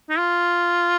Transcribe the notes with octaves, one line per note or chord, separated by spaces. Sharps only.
D#4
F4